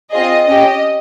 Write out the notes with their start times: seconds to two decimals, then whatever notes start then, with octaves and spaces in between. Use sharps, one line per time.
0.11 C4 F4 G#4 D#5
0.46 C#4 G4 D#5